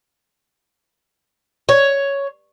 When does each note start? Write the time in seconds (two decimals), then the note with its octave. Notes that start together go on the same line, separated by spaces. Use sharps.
1.69 C#5